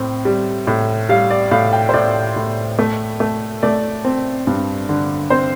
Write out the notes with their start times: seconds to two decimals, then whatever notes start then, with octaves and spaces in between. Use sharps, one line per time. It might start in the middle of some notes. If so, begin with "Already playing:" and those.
Already playing: A2 C4
0.25 G3
0.67 A2
1.09 G3 F5
1.31 D5
1.51 A2 F5
1.73 G5
1.89 C5
1.94 A2 D5
2.36 A2
2.79 A3
3.20 A3
3.63 A3 D5
4.05 C4
4.47 G2
4.89 D3
5.30 C4 C5